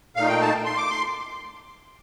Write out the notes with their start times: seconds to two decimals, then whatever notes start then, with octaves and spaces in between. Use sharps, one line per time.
0.16 A#2 A3 D#4 F5
0.28 G5
0.41 A5
0.65 C6
0.77 D6
0.90 C6